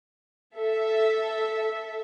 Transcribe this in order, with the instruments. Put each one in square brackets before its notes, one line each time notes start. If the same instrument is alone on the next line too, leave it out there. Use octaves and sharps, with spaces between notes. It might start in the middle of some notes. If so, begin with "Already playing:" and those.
[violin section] A4 E5